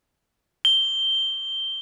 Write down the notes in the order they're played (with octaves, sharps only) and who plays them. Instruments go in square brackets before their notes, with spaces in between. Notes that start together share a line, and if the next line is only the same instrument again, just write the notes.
[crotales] G7